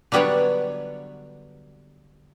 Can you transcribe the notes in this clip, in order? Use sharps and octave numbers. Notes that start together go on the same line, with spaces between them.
D3 F#3 G3 B3 D4 C#5